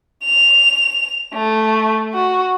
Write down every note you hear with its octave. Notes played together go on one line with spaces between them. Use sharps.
F7
A3
F#4